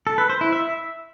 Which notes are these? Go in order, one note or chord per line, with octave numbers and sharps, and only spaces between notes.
A4
B4
C5
E4
E5